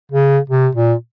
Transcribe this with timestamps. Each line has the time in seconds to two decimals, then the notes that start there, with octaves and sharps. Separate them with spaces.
0.12 C#3
0.50 C3
0.75 A#2